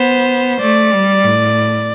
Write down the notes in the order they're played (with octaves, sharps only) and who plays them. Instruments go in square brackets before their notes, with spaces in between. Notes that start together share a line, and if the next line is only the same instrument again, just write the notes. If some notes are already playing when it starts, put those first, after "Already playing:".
Already playing: [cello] B3 [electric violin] C5
[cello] A3 [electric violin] D5
[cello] G3
A2